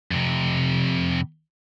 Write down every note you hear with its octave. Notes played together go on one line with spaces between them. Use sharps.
F2 C3